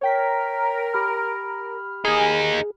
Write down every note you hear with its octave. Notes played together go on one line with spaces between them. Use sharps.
A#4 C#5 G5 B6
G4 B5 F6
A#3 D#4 G#4